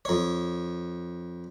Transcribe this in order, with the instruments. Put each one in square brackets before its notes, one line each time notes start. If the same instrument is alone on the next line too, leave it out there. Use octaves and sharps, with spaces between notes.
[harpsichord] F2 C#5